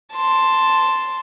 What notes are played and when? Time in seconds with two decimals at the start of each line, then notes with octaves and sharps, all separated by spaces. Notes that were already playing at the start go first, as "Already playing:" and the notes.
0.15 A5 C6